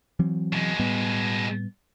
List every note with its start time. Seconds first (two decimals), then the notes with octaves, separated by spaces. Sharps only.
0.19 E3 F#3 C4
0.53 B2 G#3
0.80 A2 G3 B3